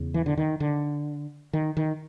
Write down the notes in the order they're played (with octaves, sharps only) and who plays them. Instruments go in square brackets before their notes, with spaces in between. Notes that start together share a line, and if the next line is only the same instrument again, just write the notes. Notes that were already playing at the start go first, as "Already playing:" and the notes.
Already playing: [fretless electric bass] E2 C#3
E3
D3
D#3
D3
D#3
D#3